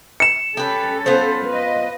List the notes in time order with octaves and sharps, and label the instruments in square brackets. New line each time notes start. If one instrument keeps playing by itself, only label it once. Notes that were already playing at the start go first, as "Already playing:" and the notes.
[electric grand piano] C#7 E7
[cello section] C#4 A4 [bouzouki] G4 B4
[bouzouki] B3 F4 C5
[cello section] B4 D#5